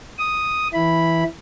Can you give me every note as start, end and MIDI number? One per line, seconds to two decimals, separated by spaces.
0.19 0.68 87
0.73 1.23 52
0.73 1.23 64
0.73 1.23 83